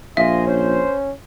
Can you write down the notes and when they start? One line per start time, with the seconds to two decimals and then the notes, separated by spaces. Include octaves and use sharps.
0.17 A#1 F4 C5 D#5 E5 G#5
0.47 C#4 C5